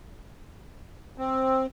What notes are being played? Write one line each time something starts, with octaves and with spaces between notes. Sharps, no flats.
C4